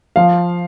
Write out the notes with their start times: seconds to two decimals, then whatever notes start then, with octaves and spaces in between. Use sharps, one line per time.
0.16 F3 F5